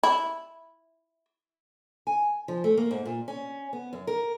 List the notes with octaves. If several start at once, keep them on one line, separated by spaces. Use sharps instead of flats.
E4
G#5
F3
A3
A#3
G#2
A#2
C#4
B3
F#2
A#4